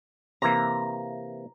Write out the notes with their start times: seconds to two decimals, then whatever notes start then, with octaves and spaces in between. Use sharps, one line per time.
0.42 C3 E3 A#3 A#5